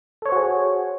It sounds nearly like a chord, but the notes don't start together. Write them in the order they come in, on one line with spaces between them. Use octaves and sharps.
A4 C#5 C5 F#4 G#4